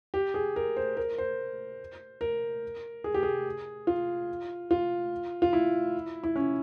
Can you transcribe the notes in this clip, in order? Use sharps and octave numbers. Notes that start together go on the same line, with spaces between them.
G4
G#4
A#4
C5
A#4
C5
A#4
G#4
G4
G#4
F4
F4
F4
E4
E4
C#4